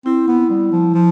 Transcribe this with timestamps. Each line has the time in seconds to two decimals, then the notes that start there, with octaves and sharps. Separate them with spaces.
0.05 C4 E4
0.28 B3
0.50 G3
0.72 F3
0.94 F3